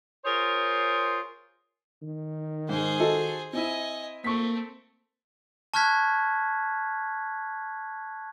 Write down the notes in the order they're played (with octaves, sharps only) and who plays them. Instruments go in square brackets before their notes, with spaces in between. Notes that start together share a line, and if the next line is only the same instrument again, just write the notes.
[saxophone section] F4 G#4 A#4 C5 C#5
[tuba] D#3
[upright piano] G#2 [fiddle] G#4 C5
[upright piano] F#4 A4 D#5
[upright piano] C4 E4 [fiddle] D#5 G#5
[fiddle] A3 C4 [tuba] A#3 [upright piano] C#6 B6
[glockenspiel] A5 C#6 F6 F#6 G#6 B6